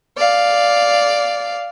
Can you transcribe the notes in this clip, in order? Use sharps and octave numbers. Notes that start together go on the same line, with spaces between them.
D5 F5